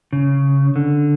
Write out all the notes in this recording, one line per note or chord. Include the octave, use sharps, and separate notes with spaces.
C#3
D3